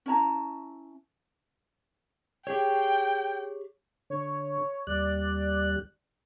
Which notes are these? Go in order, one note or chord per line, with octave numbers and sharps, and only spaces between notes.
C#4 E4 A5 A#5
G4 G#4 C#5 G5
D3 C#5
D#2 G3 D5 F#6